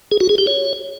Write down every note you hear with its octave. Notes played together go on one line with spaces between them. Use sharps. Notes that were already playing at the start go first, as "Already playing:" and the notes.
G#4
F#4
G#4
G4
C#5